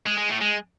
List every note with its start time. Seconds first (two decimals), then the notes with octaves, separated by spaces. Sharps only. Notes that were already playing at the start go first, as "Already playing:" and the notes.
0.06 G#3
0.18 G#3
0.30 A2
0.41 G#3